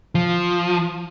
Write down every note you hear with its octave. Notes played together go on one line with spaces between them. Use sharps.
F3